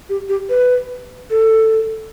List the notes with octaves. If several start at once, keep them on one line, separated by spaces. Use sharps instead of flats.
G4
G4
B4
A4